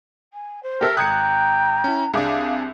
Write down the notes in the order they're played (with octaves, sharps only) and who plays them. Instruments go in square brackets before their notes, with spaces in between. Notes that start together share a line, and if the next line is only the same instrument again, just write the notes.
[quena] G#5
C5
[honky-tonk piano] G4 A4 E5 [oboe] A#4
[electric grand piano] G#1 F#6 [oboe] G5 [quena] A#5 [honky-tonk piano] D#6 G#6 C#7
[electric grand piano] C#4 E4
[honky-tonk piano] C2 C3 D6 [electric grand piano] D4 G#4 [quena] F5